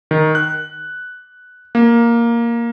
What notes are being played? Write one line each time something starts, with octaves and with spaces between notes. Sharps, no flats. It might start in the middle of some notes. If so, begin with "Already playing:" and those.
D#3
F#6
A#3